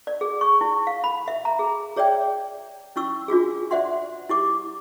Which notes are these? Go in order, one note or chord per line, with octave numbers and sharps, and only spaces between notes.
D5
G#4
C#6
E4
F5
B5
E5
A#5
G#4
G#4 C#5 D5 E5 G5
C#4 E4 C#6 E6
D4 F4 F#4 G#4
C5 D5 E5 F#5 C6
E4 G4 D6